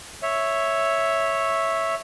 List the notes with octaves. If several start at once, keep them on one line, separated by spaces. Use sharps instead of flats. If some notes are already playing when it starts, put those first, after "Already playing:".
C#5 E5